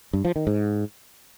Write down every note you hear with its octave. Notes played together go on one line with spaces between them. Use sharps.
G2
F3
D#3
G#2